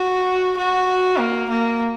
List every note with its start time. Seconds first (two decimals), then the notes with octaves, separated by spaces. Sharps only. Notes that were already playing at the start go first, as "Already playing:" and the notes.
Already playing: F#4
0.57 F#4
1.19 A#3
1.49 A#3